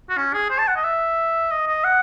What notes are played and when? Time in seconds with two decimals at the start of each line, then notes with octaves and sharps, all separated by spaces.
0.10 F#4
0.17 C#4
0.34 G#4
0.50 C5
0.58 A5
0.68 F#5
0.76 D#5
0.84 E5
1.51 D#5
1.67 D#5
1.84 F#5